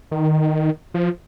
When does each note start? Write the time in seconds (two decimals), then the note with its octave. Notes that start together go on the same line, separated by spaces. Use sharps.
0.11 D#3
0.94 F3